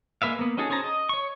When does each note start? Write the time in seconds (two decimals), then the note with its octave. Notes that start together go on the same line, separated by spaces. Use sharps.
0.22 G#3 A#3 B4 E5 F5
0.39 A#3 B3
0.57 C#4 D#4 F#4 G#4 A4
0.70 C#4 G#4 C5 A5 A#5
0.84 D#5
1.09 C#5 C#6